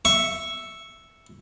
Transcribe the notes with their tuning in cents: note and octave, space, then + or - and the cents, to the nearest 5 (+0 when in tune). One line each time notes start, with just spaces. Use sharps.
E5 +0 C#6 +0